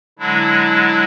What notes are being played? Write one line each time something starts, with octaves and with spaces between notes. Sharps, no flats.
D3 F#3 G#3 D4 E4